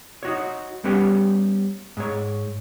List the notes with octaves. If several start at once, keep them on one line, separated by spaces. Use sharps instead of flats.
D#4 F#4 C#5
G3 B3 C#4 G4 C#5
G#2 C#5